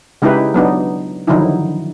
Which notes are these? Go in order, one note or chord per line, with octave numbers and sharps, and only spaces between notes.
C#3 G#3 D#4 E4 G4 B4
F#3 B3 D4 D#4
D3 D#3 F3 F#3 D#4 E4